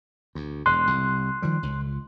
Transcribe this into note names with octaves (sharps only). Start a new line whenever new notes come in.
D2
E1 C6 F#6
C2
D#3 F3 G3
C#2